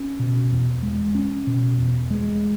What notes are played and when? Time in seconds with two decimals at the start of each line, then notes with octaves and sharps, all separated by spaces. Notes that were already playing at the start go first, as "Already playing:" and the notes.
Already playing: C#4
0.19 B2
0.51 E2
0.83 G#3
1.15 C#4
1.47 B2
1.78 E2
2.11 G#3